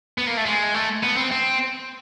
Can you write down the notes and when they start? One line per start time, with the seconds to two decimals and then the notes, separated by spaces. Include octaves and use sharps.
0.18 B3
0.27 A#3
0.37 A3
0.46 G#3
0.74 A3
1.03 B3
1.17 C4
1.32 C4